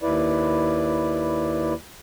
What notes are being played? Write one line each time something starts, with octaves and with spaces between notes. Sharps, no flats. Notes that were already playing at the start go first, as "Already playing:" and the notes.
D#2 E4 B4 D5